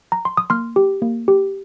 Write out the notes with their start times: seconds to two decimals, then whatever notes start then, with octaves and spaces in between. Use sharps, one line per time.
0.12 A#5
0.25 C6
0.37 D#6
0.50 A#3 C6 F6
0.76 G4
1.02 A#3
1.28 G4